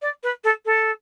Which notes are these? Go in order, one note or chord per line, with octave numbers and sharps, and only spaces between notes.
D5
B4
A4
A4